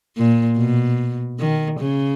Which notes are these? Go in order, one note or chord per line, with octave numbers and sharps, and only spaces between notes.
A#2
B2
D#3
C#3